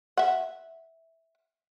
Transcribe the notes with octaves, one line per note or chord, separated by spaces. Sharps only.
E5 F#5